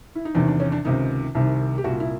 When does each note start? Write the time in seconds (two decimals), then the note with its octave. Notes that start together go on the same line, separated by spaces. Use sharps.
0.15 E4
0.25 D#4
0.35 E2 C3 D#3 D4
0.48 D4
0.60 C#4
0.72 D4
0.85 C#2 C3 D#3 D#4
1.35 C2 C3 D#3
1.78 G4
1.84 C2 A#2 F#4
2.00 E4